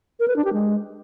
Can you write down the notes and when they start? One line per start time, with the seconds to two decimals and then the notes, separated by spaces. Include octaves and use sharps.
0.20 A#4
0.28 B4
0.36 D4
0.44 G4
0.53 G#3